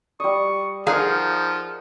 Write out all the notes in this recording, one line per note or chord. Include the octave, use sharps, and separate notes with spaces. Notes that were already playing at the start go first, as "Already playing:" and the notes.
G3 D#5 C#6
F3 D#4 G#4 A#4 D#5 F5 F#5